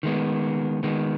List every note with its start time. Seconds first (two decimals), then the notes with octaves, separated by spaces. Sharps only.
0.03 D#3 G#3 B3
0.83 D#3 G#3 B3